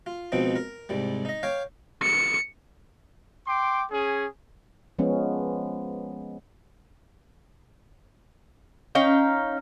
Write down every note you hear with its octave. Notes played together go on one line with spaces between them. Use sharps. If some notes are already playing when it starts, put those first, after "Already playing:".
F4
C#2 B2 F3 C4 D#4
A#4
C2 G#2 G3
D#4 D#5
C#5 F5 G5 D6
C#7
G5 C6 D6
C#4 G#4
F3 G#3 B3 C#4
C#4 D#4 F5 G5